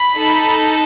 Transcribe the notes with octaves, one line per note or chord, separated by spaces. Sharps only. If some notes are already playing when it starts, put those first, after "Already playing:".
Already playing: B5
D#4 A4